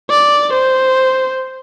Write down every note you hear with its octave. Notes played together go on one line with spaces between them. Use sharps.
D5
C5